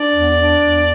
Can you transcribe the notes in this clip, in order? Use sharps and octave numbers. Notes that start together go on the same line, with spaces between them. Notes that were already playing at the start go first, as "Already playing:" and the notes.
Already playing: D4 D5
E2
D4
E2